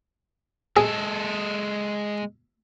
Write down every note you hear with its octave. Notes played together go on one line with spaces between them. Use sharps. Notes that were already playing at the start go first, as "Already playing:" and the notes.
G#3 G#4 A4